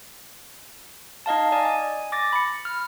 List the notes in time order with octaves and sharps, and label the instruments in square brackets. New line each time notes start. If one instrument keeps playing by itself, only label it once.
[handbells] D#4 D#5 F5 A5
D5 D#5 G#5
G#5
D6 A6 A#6
B5 C#7
F6